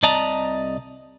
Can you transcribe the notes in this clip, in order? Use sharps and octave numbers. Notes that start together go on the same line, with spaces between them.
C2 C3 D5 D#5 A5 A#5